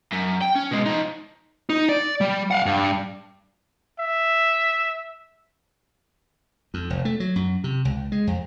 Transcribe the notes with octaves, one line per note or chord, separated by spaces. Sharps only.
F#2
G5
C#4
B2 G#3
F3 D#4
D#4
D5
G3
F5 F#5
G2
E5
F2
F1
A3
F#3
F#2
C3
C#2
G#3
F2